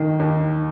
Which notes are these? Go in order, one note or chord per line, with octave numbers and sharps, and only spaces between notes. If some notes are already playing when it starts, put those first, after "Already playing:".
Already playing: D#2 D#3
D#2